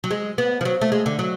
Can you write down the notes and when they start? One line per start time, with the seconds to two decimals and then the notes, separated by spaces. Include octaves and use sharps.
0.04 F#3
0.11 G#3
0.38 B3
0.61 F3
0.65 F#3
0.81 A3
0.92 G#3
1.06 D3
1.19 F#3